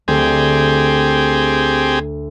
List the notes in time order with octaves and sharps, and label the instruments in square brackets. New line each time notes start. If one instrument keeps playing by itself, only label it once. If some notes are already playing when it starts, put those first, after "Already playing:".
[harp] D2 [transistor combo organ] C4 G4 G#4